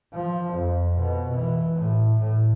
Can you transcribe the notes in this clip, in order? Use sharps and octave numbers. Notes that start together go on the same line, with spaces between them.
F3
F2
B2
E3
A2
A2